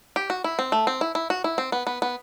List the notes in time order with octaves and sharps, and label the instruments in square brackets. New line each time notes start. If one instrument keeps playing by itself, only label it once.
[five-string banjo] G4
F#4
E4
C4
A3
C4
E4
E4
F#4
E4
C4
B3
B3
B3